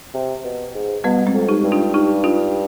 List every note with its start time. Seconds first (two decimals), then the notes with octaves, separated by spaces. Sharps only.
0.14 C3
0.45 B2
0.75 G#2
1.04 B2 G3 B3
1.27 G#3 C4
1.34 F2
1.49 D#4 G4
1.65 G2
1.72 D4 F4
1.94 D#4 G4
2.24 D4 F4